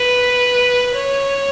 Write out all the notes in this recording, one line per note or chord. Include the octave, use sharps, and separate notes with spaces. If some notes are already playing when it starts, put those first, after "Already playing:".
Already playing: B4
C#5